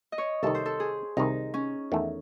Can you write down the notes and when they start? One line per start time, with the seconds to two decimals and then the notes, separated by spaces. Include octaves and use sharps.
0.12 D#5
0.18 C#5
0.43 C2 C3 D#3 A4
0.55 C5
0.66 A4
0.80 G#4
1.17 C2 C3 D#3 D#4
1.54 C#4
1.92 E2 D#3 A3